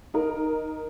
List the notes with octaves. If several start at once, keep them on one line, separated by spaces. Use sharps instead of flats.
D#4 A#4